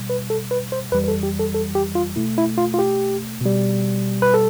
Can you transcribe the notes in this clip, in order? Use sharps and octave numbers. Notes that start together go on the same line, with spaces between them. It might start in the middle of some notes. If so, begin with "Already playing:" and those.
Already playing: B2 G3
B4
A4
B4
C5
F2 E3 G3 B4
B4
A4
G4
A4
A4
G4
F4
B2 A3 E4
E4
F4
F4
G4
B2 G3
B4
A4